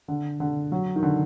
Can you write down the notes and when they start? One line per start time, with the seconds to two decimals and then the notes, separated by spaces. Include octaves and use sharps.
0.08 D3
0.40 D3
0.72 F#3
0.96 D#3
1.03 D3